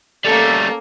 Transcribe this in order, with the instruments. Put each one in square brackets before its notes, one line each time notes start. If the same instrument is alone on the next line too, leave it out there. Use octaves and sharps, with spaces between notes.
[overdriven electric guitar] G3 A3 [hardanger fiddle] A#3 C#4 [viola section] A4 [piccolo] A6